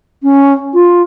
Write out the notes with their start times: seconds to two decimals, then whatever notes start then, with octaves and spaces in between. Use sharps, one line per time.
0.23 C#4
0.74 F4